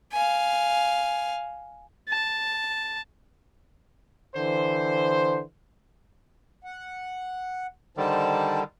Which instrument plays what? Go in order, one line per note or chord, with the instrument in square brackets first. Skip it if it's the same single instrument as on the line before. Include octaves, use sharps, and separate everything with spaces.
[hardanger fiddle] F5 G#5
[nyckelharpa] A5
[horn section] D3 E3 C5
[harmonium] F#5
[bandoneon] D3 D#3 G3 [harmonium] D#4 C5 A5